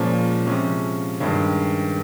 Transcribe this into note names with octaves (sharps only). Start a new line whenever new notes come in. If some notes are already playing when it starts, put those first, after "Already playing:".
Already playing: A#2 F3 G#3 C#4
C3 F3 G#3 C#4
G2 D#3 G#3 C#4